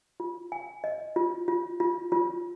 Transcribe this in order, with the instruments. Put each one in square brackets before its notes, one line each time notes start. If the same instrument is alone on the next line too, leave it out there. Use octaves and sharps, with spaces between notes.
[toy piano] F4
G#5
D#5
F4
F4
F4
F4